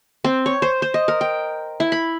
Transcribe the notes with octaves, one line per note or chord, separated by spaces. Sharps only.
C4
C#5
C5
C5
D#5
A#4
G5
E4
B5